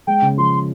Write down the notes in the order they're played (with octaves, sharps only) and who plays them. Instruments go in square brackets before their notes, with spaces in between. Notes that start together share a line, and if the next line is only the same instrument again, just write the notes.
[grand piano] G#3 [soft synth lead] G5
[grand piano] C#3
[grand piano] F3 [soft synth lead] C6